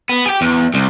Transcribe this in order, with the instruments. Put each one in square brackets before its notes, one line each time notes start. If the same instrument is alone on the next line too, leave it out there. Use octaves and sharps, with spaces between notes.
[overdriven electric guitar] B3
G4 G#4
E2
C2